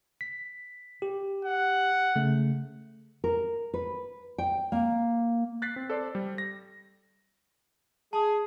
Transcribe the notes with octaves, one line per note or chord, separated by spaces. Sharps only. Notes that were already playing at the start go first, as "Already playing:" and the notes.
B6
G4
F#5
C#3 A3
A#4
B4
G5
A#3
F#6 A6 B6 C7
C4
A4 C5 D5
G3
A#6
G#4 A5